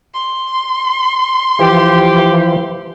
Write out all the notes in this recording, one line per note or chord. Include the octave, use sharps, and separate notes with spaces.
C6
E3 F3 G4